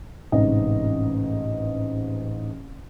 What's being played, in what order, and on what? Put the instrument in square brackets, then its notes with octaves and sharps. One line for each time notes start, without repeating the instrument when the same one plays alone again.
[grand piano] A1 G#2 C3 D#5